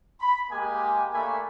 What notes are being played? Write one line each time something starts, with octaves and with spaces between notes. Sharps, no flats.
B5
G#3 A#3 G4 G#5
A3 A#3 D4 A4 G#5 B5